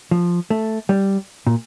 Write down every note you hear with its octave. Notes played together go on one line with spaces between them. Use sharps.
F3
A3
G3
A#2